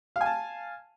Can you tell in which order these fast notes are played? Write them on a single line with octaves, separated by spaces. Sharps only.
F5 G#5 A5